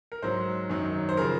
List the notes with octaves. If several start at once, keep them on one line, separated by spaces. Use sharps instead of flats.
A#4
G#2 F#3 C5
F#2 D#3 F#3
C5
C#3 F3 A#4